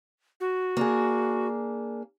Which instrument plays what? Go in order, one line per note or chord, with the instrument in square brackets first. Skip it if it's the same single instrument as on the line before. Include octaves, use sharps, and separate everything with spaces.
[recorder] F#4
[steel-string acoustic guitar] A#3 D4 G#4